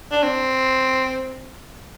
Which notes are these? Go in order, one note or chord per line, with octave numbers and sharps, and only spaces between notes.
D4
C4